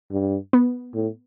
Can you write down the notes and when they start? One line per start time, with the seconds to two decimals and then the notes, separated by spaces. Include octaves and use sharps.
0.12 G2
0.53 B3
0.95 A2